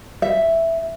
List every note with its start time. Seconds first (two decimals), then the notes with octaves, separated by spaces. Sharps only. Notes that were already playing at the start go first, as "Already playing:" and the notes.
0.22 E5